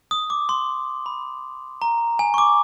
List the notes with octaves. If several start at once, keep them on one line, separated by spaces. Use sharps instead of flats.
D#6
D6
C6
B5
A#5
G#5
C#6
D6